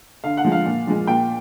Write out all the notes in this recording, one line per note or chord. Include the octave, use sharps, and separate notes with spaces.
D3 F5
F#5
F3 G#3
F5
A#2
F3 G#3
A#2 G5